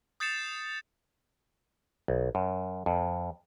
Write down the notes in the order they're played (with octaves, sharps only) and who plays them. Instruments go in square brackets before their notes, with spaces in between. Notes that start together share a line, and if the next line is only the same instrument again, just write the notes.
[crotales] D#6 G6 A6 C7 C#7 E7
[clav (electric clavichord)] B1
F#2
F2